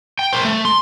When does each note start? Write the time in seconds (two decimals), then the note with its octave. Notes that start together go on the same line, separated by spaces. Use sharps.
0.19 G5
0.33 A#4 C5
0.45 A3
0.65 C6